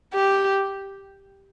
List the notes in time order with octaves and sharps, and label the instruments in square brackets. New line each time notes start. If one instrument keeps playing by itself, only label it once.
[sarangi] G4